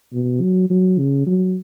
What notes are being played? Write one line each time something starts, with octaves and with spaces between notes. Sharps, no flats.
B2
F#3
F#3
C#3
F#3